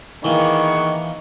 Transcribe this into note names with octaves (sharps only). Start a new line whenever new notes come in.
D#3 E3 A#3 B3 G#4 C#6